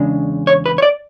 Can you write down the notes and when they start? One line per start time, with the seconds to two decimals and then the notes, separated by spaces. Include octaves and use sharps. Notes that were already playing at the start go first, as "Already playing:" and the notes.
Already playing: E2 C#3 G#3 D4
0.47 C#5
0.66 B4
0.78 C#5
0.82 D5